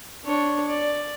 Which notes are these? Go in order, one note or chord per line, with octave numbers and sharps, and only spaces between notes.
D4 C#5
D5